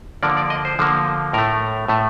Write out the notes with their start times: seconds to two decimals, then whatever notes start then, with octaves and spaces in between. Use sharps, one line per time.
0.23 D3 F3 A#3 D5
0.37 D5
0.50 D#5
0.65 C5
0.79 D3 F3 A#3
1.33 A2 A3 A#4
1.88 A2 A3